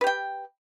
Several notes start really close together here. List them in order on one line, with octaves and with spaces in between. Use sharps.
B4 G4 G5